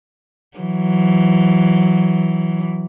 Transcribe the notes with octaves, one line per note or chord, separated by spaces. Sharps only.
E3 F#3